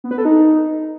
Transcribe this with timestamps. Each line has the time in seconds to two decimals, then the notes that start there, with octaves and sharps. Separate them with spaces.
0.04 B3
0.11 B4
0.18 A4
0.25 D#4